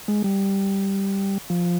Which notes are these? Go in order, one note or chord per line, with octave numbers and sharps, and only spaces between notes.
G#3
G3
F3